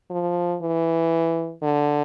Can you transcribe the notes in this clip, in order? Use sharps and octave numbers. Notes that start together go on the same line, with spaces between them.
F3
E3
D3